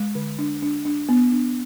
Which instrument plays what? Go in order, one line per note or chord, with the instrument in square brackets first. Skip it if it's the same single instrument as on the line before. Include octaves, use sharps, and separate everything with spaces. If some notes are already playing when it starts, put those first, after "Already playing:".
Already playing: [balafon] G#3
D3
D4
D4
D4
B3
D4